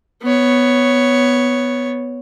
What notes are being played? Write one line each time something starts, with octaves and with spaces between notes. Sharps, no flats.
B3 C#5